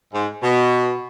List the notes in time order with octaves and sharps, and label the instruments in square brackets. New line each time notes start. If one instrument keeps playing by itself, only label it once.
[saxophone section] G#2
B2